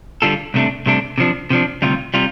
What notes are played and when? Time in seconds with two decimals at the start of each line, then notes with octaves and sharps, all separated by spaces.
0.22 D3 G3 F4 A4
0.54 C2 C3 A3 D4
0.86 C2 C3 A3 D4
1.18 C3 F3 D4
1.50 C3 F3 D4
1.82 D2 C3 G3 F4
2.14 C3 G3 F4